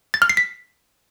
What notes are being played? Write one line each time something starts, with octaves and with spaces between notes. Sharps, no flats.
A6
F6
C7
B6